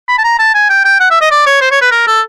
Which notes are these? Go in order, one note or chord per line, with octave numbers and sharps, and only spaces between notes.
B5
A5
A#5
A5
G#5
G5
G5
F#5
E5
D#5
D5
C#5
C5
C#5
B4
A#4
A4